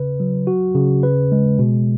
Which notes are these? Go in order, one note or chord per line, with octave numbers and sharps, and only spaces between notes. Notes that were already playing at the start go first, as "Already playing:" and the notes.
Already playing: C#3 B4
F#3
F#4
C#3
B4
G#3
B2